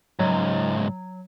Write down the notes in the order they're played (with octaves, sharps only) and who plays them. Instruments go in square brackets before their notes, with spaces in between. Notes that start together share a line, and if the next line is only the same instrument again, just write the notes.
[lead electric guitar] C#2 G#2 [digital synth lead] F#3